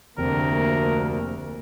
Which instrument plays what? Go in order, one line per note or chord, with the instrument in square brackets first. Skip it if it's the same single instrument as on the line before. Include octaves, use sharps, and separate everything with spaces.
[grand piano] F1 C4 [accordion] D2 [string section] A#3 [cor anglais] A#4